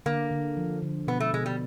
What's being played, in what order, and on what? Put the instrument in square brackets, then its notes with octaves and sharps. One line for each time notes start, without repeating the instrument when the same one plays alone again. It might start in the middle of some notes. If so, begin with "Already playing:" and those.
[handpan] D3 [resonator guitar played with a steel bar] A#3
[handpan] D3
F3
D3
[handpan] B2 [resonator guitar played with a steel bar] B3
[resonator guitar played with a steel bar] A3
[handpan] B2 [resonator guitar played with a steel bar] G#3
[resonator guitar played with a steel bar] G3